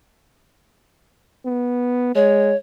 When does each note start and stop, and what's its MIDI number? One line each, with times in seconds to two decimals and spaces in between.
1.45 2.10 59
2.15 2.53 56
2.15 2.56 73